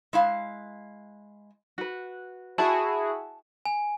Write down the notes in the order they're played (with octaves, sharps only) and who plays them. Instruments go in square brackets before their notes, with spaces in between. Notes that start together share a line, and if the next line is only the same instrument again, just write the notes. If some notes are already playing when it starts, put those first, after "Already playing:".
[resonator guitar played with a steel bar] G#3 E4 F5
[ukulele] F#4 B4
[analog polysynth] E4 F#4 G#4 [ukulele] A5
[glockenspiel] G#5